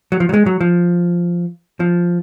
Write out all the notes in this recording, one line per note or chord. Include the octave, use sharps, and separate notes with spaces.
F#3
F3
F#3
G#3
F#3
F3
F3